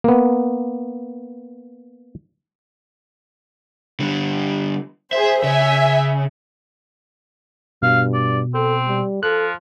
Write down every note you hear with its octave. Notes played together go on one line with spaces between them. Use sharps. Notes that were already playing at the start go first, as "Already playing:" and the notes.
A#3 B3
D3 G3
G#4 C5 E5
C#3 E5 G#5
G2 B2 F5
D5
C4 A4
G3
F3 A4 F#6